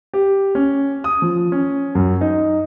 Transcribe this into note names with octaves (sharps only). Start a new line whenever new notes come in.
G4
C#4
D#6
F3
C#4
F#2
D#4